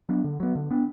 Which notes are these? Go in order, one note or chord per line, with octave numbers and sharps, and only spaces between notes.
F#3 B3 D4
D3
F#3 B3
D3
B3 D4